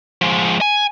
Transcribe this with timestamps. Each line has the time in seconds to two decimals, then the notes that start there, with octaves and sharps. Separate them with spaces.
0.21 F3 G#3
0.61 G#5